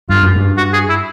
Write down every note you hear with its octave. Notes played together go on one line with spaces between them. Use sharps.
G2 F4
F#2
G2
F#4
G#4
E4